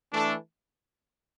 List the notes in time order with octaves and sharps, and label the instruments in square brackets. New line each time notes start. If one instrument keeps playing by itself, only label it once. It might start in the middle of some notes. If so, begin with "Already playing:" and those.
[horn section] E3 A3 D4 A4